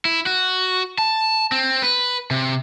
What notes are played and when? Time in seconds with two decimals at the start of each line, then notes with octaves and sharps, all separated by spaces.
0.05 E4
0.26 F#4
0.98 A5
1.52 C4
1.82 B4
2.31 C3